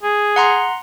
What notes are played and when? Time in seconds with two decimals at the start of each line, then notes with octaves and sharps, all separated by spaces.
0.03 G#4
0.36 F#5 A#5 C6